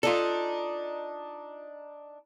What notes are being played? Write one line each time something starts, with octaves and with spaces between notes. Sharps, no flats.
D4 D#4 F4 A4